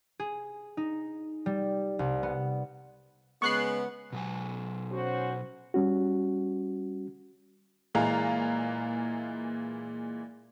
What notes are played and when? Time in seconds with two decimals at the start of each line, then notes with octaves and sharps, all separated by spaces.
0.20 G#4
0.77 D#4
1.46 G3
1.99 C2
2.23 B3
3.42 C#3 G#3 B3 C#6 F#6 C7
4.12 B2 F#3 G#5
4.91 C#4 F#4 C5
5.74 G3 C#4 F#4
7.95 A#2 E3 G#3 F5 A#5